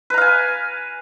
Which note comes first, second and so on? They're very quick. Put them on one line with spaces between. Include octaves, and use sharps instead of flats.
B4 A#5 F5 G#5